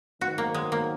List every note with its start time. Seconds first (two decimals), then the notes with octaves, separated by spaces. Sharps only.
0.21 G#2 D#3 F#3 B3 F#4
0.38 A#3
0.54 G#3
0.72 A#3